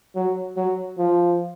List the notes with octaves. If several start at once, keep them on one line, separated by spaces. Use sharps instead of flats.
F#3
F#3
F3